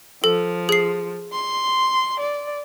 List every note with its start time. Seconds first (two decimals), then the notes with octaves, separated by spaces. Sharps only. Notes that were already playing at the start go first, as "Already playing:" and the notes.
0.24 F3 A4
0.69 G#4 C7
1.32 C6
2.20 D5